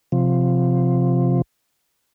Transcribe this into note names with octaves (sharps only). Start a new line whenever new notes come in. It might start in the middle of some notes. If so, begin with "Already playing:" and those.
C3 F3